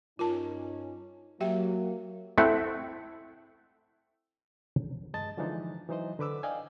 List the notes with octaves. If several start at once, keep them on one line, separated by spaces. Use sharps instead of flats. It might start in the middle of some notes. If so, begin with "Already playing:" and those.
G2 C#4 D#4 F4 A#4 A5
F#3 A#3 G4 E5 G5
A3 C4 E4 F#5
G2 G#3 D#5 A5 A6
D3 E3 F3 G#3 D4 D#4
E3 F#3 D#4 C5 D#5
D3 B4 D6 E6
D5 D#5 F5 G5 G#5